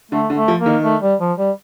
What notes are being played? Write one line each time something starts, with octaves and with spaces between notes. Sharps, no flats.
D3 A3
D3
A3
F3
A#3
D#3
A3
G3
F3
G3